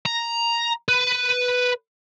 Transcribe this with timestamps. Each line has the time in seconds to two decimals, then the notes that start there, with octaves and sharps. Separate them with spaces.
0.06 A#5
0.88 B4